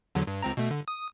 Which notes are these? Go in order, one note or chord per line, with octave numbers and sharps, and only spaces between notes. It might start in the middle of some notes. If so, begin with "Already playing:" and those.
E2 D3 F#3
G2
C#2 C4 A#5
B2 A3
D3
D#6